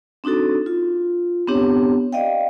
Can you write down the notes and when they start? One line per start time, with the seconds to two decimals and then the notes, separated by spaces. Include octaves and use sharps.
0.24 C4 D4 D#4 F#4 A4
0.66 F4
1.47 B3 C4 D4 G4 C#5
2.13 D5 D#5 F5 G5